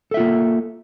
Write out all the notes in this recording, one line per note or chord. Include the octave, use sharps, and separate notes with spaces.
A#3 F4 A4 E5